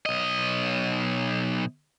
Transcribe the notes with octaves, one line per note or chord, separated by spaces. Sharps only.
B1 D#5